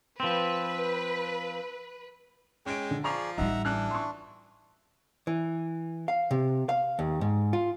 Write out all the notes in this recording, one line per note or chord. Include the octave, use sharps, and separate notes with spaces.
F3 C4 B4
G#3 C#4 G5 D7
D3
F3 G#4 D5 A#5 C#6 F7
A1 G3 D#4 E5 F#5 A#5
E3 D4 F6 F#6
C6 C#6
E3
F5
C3
F5
D#2
G#2
F4